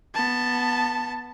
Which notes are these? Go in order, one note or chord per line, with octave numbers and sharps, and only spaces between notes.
B3 A5